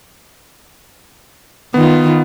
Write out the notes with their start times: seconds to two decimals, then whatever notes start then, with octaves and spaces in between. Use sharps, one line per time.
1.74 D#3 B3 F4